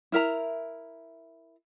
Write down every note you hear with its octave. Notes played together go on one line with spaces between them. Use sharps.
E4 A#4 E5 A#5